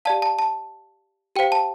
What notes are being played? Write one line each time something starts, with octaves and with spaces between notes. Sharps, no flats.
G4 D5 F5 A5
A5
A5
G4 C5 F5 G5
A5